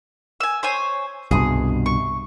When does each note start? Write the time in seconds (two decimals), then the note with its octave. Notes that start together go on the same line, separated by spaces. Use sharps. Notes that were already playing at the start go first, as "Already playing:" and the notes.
0.40 G#5 E6
0.63 C5 C#5 G#5
1.31 C2 G2 B2 G#4
1.86 C#6